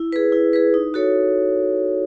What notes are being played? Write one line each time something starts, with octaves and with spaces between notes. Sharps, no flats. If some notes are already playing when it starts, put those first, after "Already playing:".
Already playing: E4
G#4 B4
E4
G#4 B4
D#4
F#4 A4 C#5